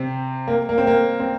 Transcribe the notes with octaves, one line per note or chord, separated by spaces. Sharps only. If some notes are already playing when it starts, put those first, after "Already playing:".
Already playing: C3 C4
A#3
A#3
C4
A#3
C4